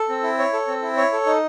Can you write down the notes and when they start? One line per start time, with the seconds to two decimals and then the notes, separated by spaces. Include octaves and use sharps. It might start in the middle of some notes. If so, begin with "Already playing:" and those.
Already playing: A4
0.09 C4
0.23 E4
0.39 C#5
0.53 A4
0.67 C4
0.82 E4
0.97 C#5
1.12 A4
1.26 D#4